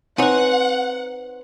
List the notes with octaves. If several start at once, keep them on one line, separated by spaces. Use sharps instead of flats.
C4 D#4 B4 C#5 F#5 G#5